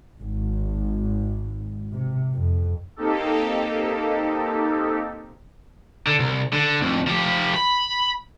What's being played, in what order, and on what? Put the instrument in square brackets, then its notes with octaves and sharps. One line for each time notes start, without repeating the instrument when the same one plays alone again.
[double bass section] G#1
C3
F2
[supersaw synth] A#3 C4 D#4 G4 A4
[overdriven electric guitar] D3
C2
D3
C2 F2
F3 G4
B5